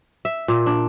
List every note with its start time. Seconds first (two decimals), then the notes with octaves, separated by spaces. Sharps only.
0.25 E5
0.48 A#2
0.66 D4